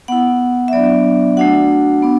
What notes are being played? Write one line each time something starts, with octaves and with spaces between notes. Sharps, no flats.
B3 E4 F#5
E5
F#3 B3 D4 D5
A3 D4 F#4 F#5
B3 D4